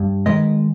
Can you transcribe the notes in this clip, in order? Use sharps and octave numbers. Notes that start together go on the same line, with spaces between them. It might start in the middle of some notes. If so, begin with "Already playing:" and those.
Already playing: G2
D#3 G#3 B4 D#5